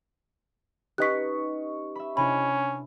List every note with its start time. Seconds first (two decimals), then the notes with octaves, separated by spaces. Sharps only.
0.98 C#4 D#4 G4 B4 D#5 C#6 F#6 B6
1.96 E5 B5
2.17 C3 C#4 D4 E4 B5